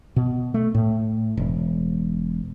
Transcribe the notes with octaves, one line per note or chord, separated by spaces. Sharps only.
B2
A3
A2
E1